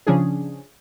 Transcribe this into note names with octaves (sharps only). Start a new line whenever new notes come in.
C#3 F3 C#4 D4 G#4